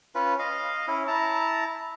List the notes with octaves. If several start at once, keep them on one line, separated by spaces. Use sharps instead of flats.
C#4 F4 B4
D#5 F5
C#4 E4
E4 A5 A#5